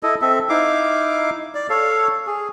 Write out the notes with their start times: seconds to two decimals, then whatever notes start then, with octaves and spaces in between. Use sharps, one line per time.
0.03 E4 A4 D#5
0.22 C4 A4 E5
0.50 D#4 E4 F5 D6
1.55 D5
1.70 A4 C#5 F5
2.27 G#4